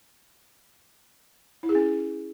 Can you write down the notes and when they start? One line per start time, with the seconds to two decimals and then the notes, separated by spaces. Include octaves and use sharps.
1.63 E4
1.69 G#4
1.75 C#4